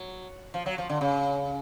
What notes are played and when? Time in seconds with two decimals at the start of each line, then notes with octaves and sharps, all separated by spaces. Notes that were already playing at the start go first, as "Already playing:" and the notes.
Already playing: F#3
0.54 F3
0.66 F#3
0.78 F3
0.89 D3
1.01 C#3